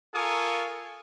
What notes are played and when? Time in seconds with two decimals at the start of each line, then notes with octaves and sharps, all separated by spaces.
0.14 F4 A4 A#4 G#5 C#6 D#6